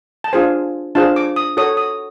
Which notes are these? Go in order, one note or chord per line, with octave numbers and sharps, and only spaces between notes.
A5
D4 F4 G#4 C5 G#5
D4 F4 G#4 C5 A5
D6
D#6
F#4 A4 C#5 D#6
D#6